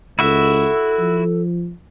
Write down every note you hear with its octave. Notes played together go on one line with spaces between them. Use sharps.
C#2 E4 F#4 A4 E5
F3